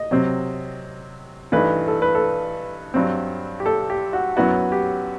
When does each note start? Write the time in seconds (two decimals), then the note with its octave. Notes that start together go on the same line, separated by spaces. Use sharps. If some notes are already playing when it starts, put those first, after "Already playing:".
Already playing: D#5
0.11 C3 F#3 C4
1.52 G2 E3 A3 D#4 B4
1.88 A4
2.02 B4
2.15 A4
2.94 G2 F#3 C4
3.60 G4
3.66 A4
3.90 G4
4.13 F#4
4.37 F#2 F#3 B3 E4 F#4
4.72 G4